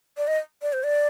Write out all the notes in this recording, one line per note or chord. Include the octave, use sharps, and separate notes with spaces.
D5
D#5
D5
C5
D5